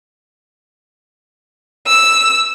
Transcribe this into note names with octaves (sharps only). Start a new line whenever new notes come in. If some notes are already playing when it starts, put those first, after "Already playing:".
E6